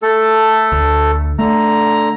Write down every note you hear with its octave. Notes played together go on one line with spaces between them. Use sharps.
A3 A4
D2
D3 A3 A#5